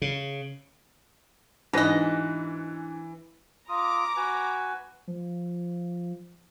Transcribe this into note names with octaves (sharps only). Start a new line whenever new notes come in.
C#3
G#2 B2 E3 D4 B4 D#5 A#6
F4 A#5 D6 D#6
F#4 B4 G#5
F3